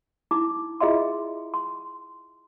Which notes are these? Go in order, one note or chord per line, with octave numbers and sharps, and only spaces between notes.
D#4 E4 D6
E4 F4 G#4 D#5 E5 C6
C6